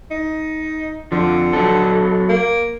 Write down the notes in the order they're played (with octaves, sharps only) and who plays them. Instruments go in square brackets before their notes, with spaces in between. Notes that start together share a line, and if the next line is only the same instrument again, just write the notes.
[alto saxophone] D#4
[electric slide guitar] F2 F3 [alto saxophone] D3
[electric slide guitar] F#3 A4
[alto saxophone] A#3